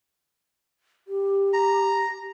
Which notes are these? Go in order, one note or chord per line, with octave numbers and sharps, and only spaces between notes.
G4
A#5